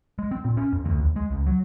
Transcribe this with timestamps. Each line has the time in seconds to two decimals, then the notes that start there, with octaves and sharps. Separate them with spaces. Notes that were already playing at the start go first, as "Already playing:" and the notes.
0.19 G#3
0.31 C4
0.45 A#2
0.57 C#4
0.73 F2
0.85 D2
1.00 D#2
1.16 G#3
1.31 C#2
1.46 F#3